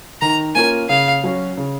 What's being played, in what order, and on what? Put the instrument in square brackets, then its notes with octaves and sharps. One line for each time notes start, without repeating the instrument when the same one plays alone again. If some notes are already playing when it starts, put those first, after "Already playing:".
[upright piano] D#3 [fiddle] A#5
[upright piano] A#3 C#4 F4 A#4 [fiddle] G#5
[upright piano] C#3 [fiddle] F5
[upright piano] F#3 C#4 F#4
C#3